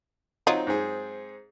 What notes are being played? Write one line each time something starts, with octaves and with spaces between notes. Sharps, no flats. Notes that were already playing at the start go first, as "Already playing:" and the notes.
F#3 C4 D#4 F4 D#5
G#2 C4 G#4